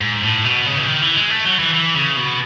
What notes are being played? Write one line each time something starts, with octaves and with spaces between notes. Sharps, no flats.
G#2
A2
B2
C#3
E3
D#3
E3
G#3
A3
F#3
E3
E3
C#3
B2